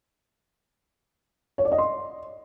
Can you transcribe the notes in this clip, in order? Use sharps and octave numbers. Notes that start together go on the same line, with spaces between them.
C#5
D5
D#5
C6